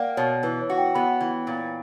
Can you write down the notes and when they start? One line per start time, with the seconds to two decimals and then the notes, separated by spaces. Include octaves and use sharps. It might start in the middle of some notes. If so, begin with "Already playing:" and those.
Already playing: A#3 D5 F#5 G5
0.17 B2 C#5
0.43 E3 B4
0.61 C#5
0.70 F#4
0.78 G5
0.95 B3 B5
1.21 E3
1.47 A#2